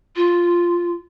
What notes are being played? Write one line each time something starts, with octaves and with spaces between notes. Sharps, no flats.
F4